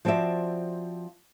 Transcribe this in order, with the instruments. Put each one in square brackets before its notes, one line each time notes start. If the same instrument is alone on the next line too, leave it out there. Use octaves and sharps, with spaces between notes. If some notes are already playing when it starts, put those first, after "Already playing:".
[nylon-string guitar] F3 C4 F#4 D5 E5